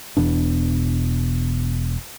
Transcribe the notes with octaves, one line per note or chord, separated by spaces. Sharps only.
E1 E2 B2 D4